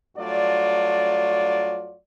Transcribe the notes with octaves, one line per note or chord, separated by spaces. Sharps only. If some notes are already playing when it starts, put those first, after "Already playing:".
G2 F#3 A3 F4 D5